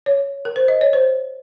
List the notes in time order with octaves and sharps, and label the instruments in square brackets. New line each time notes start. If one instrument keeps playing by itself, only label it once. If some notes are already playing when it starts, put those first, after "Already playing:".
[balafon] C#5
A#4
C5
D#5
C#5
C5